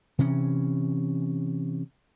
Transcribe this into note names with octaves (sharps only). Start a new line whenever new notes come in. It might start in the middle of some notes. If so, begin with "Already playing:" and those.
C3 E3 C#4